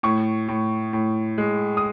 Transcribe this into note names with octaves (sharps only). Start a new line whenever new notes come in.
A2 C#6
A2
A2
G#3
D#6